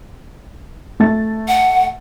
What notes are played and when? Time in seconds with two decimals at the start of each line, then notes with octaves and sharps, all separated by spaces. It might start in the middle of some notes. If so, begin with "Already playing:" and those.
1.00 A3 A6
1.48 F#5